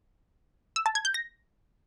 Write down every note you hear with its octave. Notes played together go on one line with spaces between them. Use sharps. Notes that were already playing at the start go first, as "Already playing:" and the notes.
E6
A5
G#6
G6
A#6